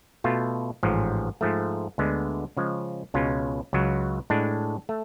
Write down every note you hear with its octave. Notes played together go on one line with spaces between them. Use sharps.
B2 A3 F4
A1 G#2 F3
G#2 F3 A3
D2 D3 G#3 B3
C#3 F3 G#3
C#2 B2 G#3 C#4 F4
C#2 C#3 F#3
A2 G#3 D4
A3